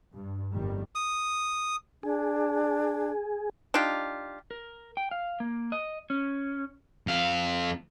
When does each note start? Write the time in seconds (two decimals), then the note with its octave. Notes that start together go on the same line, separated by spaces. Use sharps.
0.13 G2
0.53 G1 F2 A2 D#3 G3
0.95 D#6
2.03 D4 G#4
3.74 D4 D#4 F4 G4
4.51 A#4
4.97 G5
5.11 F5
5.40 A#3
5.72 D#5
6.10 C#4
7.07 F2 F5